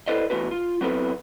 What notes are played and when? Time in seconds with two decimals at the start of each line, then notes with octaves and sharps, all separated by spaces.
0.08 E4 A4 B4 C5 D5 D#5
0.30 E3 A3 B3 F#4 B4
0.51 F4
0.81 F#3 B3 C4 E4 A4 B4